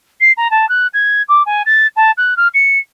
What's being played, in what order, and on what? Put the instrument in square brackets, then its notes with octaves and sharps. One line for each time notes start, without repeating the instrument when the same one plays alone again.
[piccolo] C7
A#5
A5
F#6
G#6
D6
G#5
A6
A5
F#6
F6
C#7